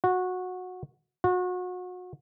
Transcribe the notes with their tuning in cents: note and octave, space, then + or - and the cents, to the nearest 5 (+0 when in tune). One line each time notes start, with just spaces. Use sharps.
F#4 -15
F#4 -30